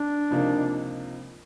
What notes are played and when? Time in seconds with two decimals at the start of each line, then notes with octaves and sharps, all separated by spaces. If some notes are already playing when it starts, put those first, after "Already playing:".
Already playing: D4
0.30 C#2 C3 F3 A#3 D#4